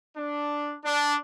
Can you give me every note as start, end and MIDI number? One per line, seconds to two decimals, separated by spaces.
0.15 0.75 62
0.84 1.16 62